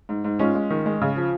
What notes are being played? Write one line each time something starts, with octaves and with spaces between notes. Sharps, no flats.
G#2
G#2
G#3 C#4 F4
G#3
D#3
G#3
C#3
F3